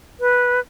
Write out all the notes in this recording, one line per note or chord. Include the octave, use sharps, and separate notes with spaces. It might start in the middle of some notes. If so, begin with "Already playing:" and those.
B4